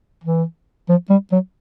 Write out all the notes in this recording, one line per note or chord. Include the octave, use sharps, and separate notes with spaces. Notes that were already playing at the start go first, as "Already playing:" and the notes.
E3
F3
G3
F#3